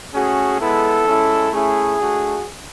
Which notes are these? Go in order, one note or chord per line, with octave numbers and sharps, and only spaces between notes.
A3 C#4 F#4 G#4
G#3 B3 E4 A4
G#3 C#4 E4
A3 C#4 E4 G#4
A3 D4 F#4